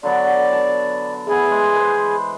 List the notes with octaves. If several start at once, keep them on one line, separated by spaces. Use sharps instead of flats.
D3 F#3 B3 D5
A5
E3 B3 G#4
G#3
B4 C5